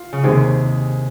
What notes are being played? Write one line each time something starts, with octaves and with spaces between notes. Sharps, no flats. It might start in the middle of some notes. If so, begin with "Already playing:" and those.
Already playing: F4
C#3
D#2 C3 D#3 G#3 D#4 G#4